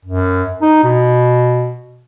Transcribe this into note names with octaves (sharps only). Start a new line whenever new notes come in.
F#2
D#4
B2